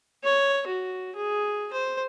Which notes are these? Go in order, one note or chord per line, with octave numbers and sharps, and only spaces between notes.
C#5
F#4
G#4
C5